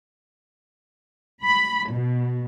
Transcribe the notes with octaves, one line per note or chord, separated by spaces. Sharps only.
B5
B2